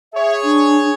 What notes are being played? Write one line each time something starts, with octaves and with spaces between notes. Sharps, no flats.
G#4 C#5 E5
D4